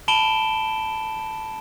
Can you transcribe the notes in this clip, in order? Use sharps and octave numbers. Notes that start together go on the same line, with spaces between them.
A5 B5 D7 E7 G7